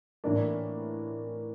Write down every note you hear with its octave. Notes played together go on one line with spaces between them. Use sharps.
A2 E3 A#3 D4